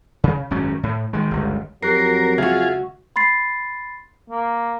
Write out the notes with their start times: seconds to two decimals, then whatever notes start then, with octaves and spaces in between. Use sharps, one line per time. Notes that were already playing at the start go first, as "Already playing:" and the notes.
0.24 C#3
0.51 G#1 F#2 F#3 C#4
0.83 A2
1.13 D#3 G#3
1.31 G1 C#2
1.83 F2 F#3 G4 A#4 F#6 C7
2.38 C#2 F4 F#4 G#4 E5
3.16 B5 C6 A6 C7
4.30 A#3